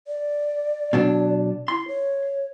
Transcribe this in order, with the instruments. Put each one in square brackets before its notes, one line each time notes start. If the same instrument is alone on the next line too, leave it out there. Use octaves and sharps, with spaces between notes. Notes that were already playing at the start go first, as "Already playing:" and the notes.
[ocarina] D5
[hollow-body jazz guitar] B2 F#3 D4
[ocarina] E4 [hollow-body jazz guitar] C6
[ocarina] C#5